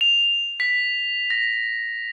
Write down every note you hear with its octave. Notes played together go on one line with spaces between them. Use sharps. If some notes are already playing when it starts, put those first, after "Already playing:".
F7
B6
A#6